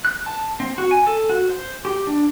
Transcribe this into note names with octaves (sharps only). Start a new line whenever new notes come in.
F#6
A5
C4
F#4
G#5
A4
F#4
C5
G4
D4